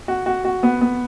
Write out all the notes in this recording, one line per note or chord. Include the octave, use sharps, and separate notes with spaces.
F#4
F#4
F#4
B3
B3